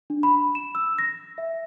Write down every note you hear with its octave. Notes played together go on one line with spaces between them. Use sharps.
D4
B5
E7
E6
A#6
E5